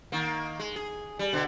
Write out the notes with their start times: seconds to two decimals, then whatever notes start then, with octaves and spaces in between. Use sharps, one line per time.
0.12 D#3 A#3
0.59 G#3
0.76 G#4
1.19 G3
1.33 B2 D3